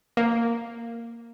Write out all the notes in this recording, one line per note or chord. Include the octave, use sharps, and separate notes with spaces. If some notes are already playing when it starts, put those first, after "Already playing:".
A#3